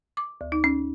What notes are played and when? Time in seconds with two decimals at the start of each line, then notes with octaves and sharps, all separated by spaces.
0.17 D6
0.41 D2
0.52 D#4
0.64 C#4